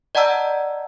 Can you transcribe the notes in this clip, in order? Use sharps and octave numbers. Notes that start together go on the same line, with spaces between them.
D5 D#5 F#5 A5 A#5 E6